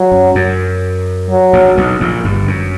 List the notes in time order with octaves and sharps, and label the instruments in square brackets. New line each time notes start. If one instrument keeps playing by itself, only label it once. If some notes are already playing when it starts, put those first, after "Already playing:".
Already playing: [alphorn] F#3
[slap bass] F#2
F#2
[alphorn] F#3
[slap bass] A#1 A#2
A#2
B1 B2
A#1 A#2
G1 G2
F#2